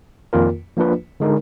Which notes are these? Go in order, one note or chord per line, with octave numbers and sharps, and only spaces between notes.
F2 D#3 A#3 F4 A#4
F3 A#3 D4 F4 B4
D3 G#3 D#4 A#4